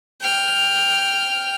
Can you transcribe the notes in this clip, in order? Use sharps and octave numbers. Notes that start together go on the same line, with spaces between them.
G5 F6